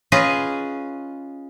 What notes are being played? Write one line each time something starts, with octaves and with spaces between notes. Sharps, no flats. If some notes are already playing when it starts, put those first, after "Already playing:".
C#4 F4 G#4 B4 D#5